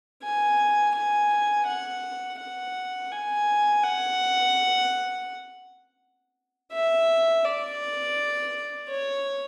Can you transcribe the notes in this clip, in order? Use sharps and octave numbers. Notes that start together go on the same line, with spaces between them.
G#5
G#5
F#5
F#5
G#5
F#5
E5
D5
C#5